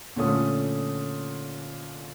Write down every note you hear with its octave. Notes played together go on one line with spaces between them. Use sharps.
A#2 D3 A3 C#4 D#6